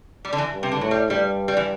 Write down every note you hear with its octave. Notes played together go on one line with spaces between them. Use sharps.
G3
D3
E3
G2
C3
D3
A2 F#3
G3
G2 G3
G3
E3